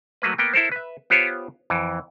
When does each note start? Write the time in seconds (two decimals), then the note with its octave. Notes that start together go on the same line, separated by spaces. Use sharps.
0.22 F#3 A3 A#3 B4
0.38 A#3 B3 G5
0.53 E4 A4 A#4 C5
0.72 B4 E5
1.10 B3 F4 G4 C5 C#5
1.70 F2 E3